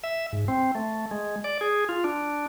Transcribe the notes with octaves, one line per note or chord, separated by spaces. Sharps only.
E5
G#2
C4
A3
G#3
D5
G#4
F4
D4